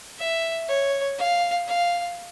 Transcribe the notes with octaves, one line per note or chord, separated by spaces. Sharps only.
E5
C#5
F5
F5